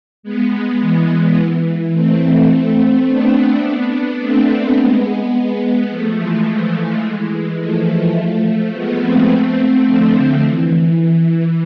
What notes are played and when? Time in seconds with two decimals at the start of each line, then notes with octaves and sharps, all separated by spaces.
0.23 G#3 B3
0.81 E3
1.93 A3 C4
3.07 B3 D4
4.19 A3 C4
4.76 G#3 B3
5.89 F3 A3
6.18 E3 G#3
6.46 E3 G#3
7.60 F3 A3
8.72 G#3 B3
9.00 A3 C4
9.29 A3 C4
9.85 D3 F3
10.42 E3